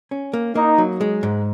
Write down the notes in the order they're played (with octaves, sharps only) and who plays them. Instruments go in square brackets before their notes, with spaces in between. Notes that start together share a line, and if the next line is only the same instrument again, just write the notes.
[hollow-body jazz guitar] C#4
A#3
[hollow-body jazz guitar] A#3 [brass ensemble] D#4
[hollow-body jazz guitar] F#3
G#3
G#2